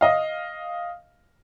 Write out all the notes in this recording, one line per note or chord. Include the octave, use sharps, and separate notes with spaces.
D#5 F5